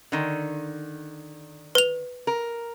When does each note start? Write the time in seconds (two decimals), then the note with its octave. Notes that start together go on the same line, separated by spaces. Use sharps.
0.12 D3 D#3
1.75 B4 F7
2.27 A#4